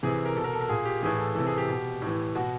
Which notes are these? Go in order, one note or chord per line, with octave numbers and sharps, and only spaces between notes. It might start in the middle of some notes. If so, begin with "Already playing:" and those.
C3 E3 G#4
A#4
B2 A4
A#4
A4
A#4
A#2 G#4
G4
A2 E3 G#4
A4
C3 E3 A4
G#4
G4
B2
A2 E3
B2 F#4